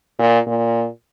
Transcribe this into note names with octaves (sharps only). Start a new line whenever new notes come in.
A#2
A#2